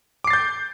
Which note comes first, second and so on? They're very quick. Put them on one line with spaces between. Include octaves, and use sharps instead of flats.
D6 C7 A6 G6